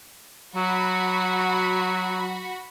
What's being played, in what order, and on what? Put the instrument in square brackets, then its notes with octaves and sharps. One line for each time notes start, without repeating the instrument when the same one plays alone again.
[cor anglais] F#3 [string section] F#4 B5